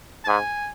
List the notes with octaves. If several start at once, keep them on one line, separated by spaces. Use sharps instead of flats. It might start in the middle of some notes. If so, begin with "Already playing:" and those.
A5
G#2 G#5